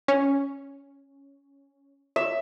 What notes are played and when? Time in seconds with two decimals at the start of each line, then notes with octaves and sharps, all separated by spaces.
0.08 C#4
2.16 E5